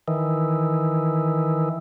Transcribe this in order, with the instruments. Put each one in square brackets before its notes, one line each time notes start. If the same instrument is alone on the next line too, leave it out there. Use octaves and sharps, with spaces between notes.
[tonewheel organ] D#3 E3